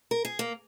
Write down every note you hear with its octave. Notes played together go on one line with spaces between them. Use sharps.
A#4
G#4
A#3